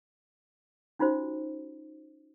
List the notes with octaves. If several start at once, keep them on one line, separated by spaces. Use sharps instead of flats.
C#4 D#4 F4 F#4 C5